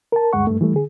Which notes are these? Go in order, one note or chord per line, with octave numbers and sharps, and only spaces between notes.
A#4 A5
D2 G2 G#3 F#5 C#6
G2 A3
E3 G3 A3
D3 G#4